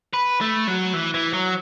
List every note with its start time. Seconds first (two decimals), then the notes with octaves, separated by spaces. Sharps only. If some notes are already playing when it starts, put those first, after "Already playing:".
0.13 B4
0.41 A3
0.67 F#3
0.94 E3
1.14 E3
1.33 F#3